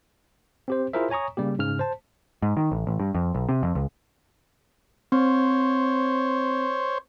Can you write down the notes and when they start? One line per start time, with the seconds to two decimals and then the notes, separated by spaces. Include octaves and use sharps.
0.68 C4 G4 C5
0.93 E4 F4 G#4 A#4 C5 E5
1.10 C#5 G#5 A#5 C#6 D#6
1.37 C#3 G3 A#3 G4
1.59 G#2 C#3 F6
1.79 C5 A5
2.42 G#2
2.57 D#3
2.72 A1
2.87 A1
3.00 G2
3.15 F2
3.35 B1
3.49 C3
3.63 F2
3.75 C#2
5.12 C4 C5 C#5